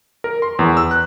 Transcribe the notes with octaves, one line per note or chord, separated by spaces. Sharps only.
A#4
C6
E2
E6
F#6